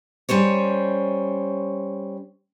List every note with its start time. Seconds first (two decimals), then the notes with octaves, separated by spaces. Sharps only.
0.29 G3 C#4 C5 C#5